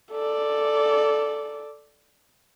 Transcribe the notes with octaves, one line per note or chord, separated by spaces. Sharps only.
A4 D5